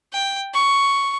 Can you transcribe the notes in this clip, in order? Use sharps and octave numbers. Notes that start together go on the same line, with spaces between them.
G5
C#6